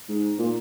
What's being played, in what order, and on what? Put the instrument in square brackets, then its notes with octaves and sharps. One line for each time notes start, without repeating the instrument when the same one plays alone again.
[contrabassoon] G#2
A#2